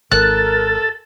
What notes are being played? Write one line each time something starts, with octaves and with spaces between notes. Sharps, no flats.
G#1 A4 A#4 F#6